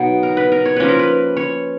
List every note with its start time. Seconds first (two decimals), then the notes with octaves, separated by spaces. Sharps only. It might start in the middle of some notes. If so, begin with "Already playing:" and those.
Already playing: B2 F#3 B3 D#4 F#4
0.23 A#4
0.37 B4
0.52 A#4
0.66 C#5
0.76 F3 A#3 C#4 B4
0.88 A#4
0.99 B4
1.37 C#5